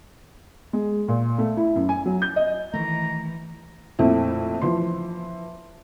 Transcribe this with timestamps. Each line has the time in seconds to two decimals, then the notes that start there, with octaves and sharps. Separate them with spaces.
0.73 G#3
1.08 A#2
1.38 A3
1.57 E4
1.75 F#2
1.89 G#5
2.06 F#3
2.22 G6
2.36 D#5
2.74 D#3 E3 A3 A#5
3.99 F2 A#2 A3 C4 E4
4.61 E3 F3 C6